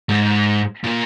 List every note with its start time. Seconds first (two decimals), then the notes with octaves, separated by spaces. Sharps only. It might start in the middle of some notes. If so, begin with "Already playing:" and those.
0.09 G#2
0.84 A#2